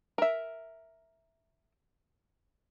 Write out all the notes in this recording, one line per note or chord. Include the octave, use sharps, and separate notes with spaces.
A#4 E5